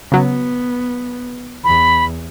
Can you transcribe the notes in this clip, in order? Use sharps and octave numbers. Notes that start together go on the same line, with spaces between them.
C#3 F#3 B3
E2 B5